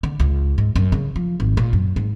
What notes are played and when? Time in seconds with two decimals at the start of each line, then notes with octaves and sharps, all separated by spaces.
0.03 D3
0.20 C#2
0.58 G#2
0.76 F#2
0.92 C#3
1.16 F3
1.40 G#1
1.57 A#2
1.73 F#2
1.96 G#2